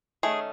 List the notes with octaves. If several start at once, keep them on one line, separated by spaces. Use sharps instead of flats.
D#3 A3 C#4 G#4